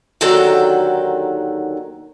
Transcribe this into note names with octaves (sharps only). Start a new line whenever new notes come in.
D#2 D3 D#3 F#3 A4 G5